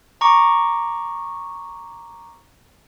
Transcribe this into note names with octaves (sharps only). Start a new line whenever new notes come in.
A#5 C#6 D6